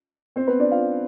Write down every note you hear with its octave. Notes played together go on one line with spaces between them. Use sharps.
C4 C5
B3 B4
D4 D5
F4 F5